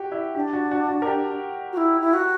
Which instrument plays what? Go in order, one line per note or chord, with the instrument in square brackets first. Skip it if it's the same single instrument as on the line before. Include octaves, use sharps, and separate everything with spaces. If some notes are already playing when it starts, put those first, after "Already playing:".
Already playing: [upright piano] F#4 G4
E4
[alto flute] D4 [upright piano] G4
[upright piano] F#4
F#4
F#4
A#4
G4
[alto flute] F#4
E4
E4
F#4